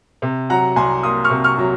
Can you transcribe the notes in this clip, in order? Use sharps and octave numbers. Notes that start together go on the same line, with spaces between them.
C3
F#3 F#5 A#5
C2 G#5 C6
A#3 C6 D#6
C#6 F6
C3
C#6 F6
F#3